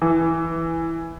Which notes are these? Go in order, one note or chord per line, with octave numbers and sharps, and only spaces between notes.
E3